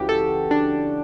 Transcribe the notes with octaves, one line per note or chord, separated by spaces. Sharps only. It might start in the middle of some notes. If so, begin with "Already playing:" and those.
Already playing: C#2 C#3 E3 F#4 G4
A4
D4